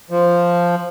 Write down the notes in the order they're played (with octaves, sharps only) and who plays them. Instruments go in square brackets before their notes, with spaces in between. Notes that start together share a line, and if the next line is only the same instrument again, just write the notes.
[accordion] F3